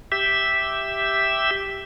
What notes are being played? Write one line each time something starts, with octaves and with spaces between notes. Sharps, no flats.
G4 E5